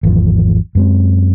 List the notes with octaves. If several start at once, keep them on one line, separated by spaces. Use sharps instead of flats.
G#1 E2 F3
F#2 G#3 C4